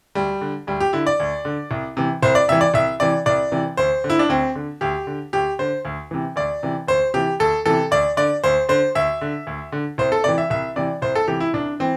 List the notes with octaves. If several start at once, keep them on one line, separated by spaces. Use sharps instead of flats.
D2 G3
D3
D2 G3
G4
D3 E4
D5
D2
D3
C2
C3 E3
C2 C5
D5
C3 E3 E5
D5
C2 E5
C3 E3 D5
C2 D5
C3 E3
D2 C5
D3
E4
D4
D2 C4
D3
D2 G4
D3
D2 G4
D3 C5
D2
C3 E3
D2 D5
C3 E3
D2 C5
C3 E3 G4
D2 A4
C3 E3 A4
D2 D5
D3 D5
D2 C5
D3 C5
D2 E5
D3
D2
D3
C2 C5
A4
C3 E3 D5
E5
C2 E5
C3 E3 D5
C2 C5
A4
C3 E3 G4
E4
C2 D4
E3 C4